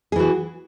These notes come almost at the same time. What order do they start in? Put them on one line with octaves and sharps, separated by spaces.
G#4 E3 F#4